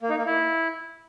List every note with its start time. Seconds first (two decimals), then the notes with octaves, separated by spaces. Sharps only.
0.01 A#3
0.09 D#4
0.18 A#3
0.26 E4